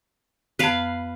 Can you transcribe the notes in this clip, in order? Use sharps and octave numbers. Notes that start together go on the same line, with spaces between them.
F2 B3 B4 F5 F#6